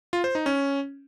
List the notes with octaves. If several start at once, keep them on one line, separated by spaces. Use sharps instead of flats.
F4
C5
D#4
C#4